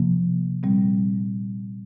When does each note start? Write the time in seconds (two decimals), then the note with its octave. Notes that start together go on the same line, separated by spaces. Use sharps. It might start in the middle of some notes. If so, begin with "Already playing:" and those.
Already playing: C3 F3 A#3
0.63 A#2 G3 C4